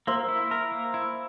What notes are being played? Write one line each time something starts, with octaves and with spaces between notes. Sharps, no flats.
A#3 C5 E5
E4
A#4
A#3
E4